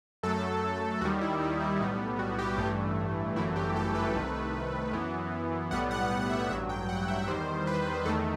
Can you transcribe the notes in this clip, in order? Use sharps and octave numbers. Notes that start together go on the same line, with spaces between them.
F#2 F#3 A3 A4
D#2 D#3 G3 F#4
E4
D#4
E4
B1 A2 G3 B3 D#4
F#4
G4
A1 G2 E3 A3
G1 F#2 E3 A3 E4
G4
A4
B4
C2 C3 D#3 A3
F#2 E3 B3
B1 A2 G3 B3 F#5
F#5
F#5
F#5
E5
A1 G2 F#3 E5
G5
F#5
E5
E2 D#3 G3 C5
B4
E2 D#3 A3 A4